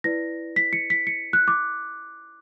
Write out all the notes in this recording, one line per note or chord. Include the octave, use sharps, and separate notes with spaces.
E4 B4 D5 A#6
B6
C#7
B6
C#7
F#6
D6